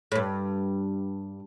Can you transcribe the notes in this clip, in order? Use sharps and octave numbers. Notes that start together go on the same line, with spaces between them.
A2
G2